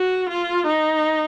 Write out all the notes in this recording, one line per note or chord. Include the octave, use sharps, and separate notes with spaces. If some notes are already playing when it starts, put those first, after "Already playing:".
Already playing: F#4
F4
D#4